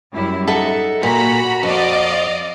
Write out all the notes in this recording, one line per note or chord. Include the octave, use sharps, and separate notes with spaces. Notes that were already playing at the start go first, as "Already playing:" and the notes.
F#2 G3 E4
D#4 A4 E5 F#5
A#2 F#4 A#5 B5
F2 D5 D#5 F5